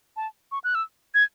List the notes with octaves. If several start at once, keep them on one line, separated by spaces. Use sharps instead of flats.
A5
C#6
F#6
E6
G#6